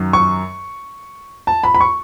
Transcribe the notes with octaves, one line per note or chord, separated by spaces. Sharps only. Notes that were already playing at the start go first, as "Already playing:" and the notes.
Already playing: F#2 D#3 F#3
C#6
A5
B5
B5
C#6